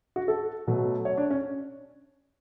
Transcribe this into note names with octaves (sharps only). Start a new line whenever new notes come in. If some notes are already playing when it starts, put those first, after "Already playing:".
F#4
A4
B2 F#3 A3
C#5
D4
C#4